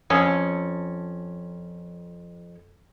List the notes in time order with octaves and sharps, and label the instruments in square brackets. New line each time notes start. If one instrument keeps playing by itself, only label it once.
[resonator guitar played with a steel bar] F2 C#4